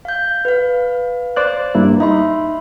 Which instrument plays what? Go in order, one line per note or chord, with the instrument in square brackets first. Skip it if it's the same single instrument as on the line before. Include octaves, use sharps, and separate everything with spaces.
[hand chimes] F5 G6
B4 F5
[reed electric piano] C5 D5 F#6
G2 A#3 E4
[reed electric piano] D#4 [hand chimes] E5 B5 C6